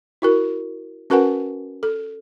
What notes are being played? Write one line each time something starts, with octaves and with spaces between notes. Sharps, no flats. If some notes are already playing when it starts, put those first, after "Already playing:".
E4 F#4 A#4
C#4 F#4 A#4 B4 F#5 G#5
A4